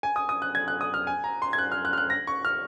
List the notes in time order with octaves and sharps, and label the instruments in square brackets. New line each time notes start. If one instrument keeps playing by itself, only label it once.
[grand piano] G#5
D#6
D#6
F#6
G#6
F#6
D#6
F6
G#5
A#5
C6
G#6
F#6
F6
F#6
F6
F#6
A#6
C#6
F6